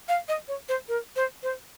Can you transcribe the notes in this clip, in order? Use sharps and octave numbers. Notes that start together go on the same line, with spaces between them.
F5
D#5
C#5
C5
A#4
C5
C5